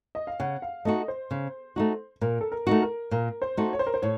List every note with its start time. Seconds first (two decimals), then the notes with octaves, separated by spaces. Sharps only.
0.15 D#5
0.27 F5
0.40 C#3 F#5
0.62 F5
0.85 A3 D#4 F#4 D#5
1.08 C5
1.31 C#3
1.76 A3 D#4 F#4
2.21 A#2 A#4
2.41 A4
2.52 A#4
2.67 A3 D#4 F#4
2.82 A#4
3.11 A#2 A#4
3.42 C5
3.57 A3 D#4 F#4
3.73 C#5
3.79 C5
3.87 A#4
3.94 C5
4.02 A2 C#5